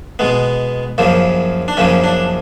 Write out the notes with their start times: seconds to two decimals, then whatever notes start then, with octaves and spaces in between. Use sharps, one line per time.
0.19 B2 G#3 B3
0.98 F#2 C#3 F3 A#3
1.68 D4
1.77 F#2 C#3 F3 A#3 C#4
2.04 D4